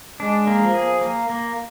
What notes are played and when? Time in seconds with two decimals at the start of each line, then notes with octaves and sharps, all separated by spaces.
0.20 G#3 D4
0.47 A#3
0.61 F3
0.74 G#4
1.01 A#3
1.30 A#3